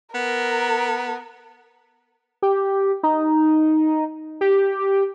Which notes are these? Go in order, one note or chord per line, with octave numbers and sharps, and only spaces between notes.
B3 A#4
G4
D#4
G4